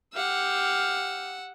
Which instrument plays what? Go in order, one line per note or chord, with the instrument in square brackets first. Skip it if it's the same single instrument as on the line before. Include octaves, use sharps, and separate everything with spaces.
[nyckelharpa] G4 F5 [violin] F#5 E6